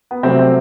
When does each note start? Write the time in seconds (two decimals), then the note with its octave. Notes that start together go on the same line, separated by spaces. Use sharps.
0.11 B3
0.23 C3 F#3 A3 C4
0.39 C4